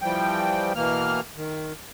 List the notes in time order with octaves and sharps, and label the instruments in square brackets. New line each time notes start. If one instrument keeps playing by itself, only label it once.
[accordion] E3 F3 G3 G5
B2 E3 A#3 F6
D#3